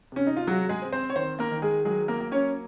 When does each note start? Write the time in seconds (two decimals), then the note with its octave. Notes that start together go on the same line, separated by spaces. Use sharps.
0.12 C3 C#4
0.27 D#4
0.37 F4
0.47 F#3 G#3 F#4
0.69 G#3 G#4
0.82 C4
0.92 C4 C5
1.10 C#5
1.16 D#3 C4 C5
1.39 A#3 A#4
1.51 D#3
1.62 G#3 G#4
1.85 F#3 G#3 G#4
2.08 A#3 A#4
2.21 A#3
2.32 C#4 C#5